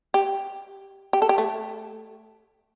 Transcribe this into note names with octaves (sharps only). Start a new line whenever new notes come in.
G4
G4
A4
G4
A3